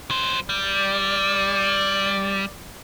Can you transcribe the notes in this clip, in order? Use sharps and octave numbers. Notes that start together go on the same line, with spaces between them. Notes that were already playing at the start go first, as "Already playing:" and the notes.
F#3 C5
G3 D5